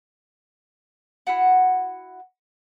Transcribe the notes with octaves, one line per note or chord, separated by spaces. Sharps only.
E4 F#4 F#5